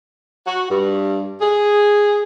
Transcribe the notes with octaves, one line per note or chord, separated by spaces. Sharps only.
F#4
G2
G#4